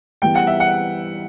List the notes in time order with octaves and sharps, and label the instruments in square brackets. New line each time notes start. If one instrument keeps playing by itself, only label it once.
[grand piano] E3 G3 B3 [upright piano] G5
[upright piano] F#5
E5
F#5